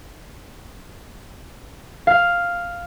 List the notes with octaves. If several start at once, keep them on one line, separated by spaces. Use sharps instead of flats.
F5